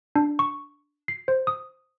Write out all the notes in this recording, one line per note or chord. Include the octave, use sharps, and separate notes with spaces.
D4
C#6
C7
C5
D#6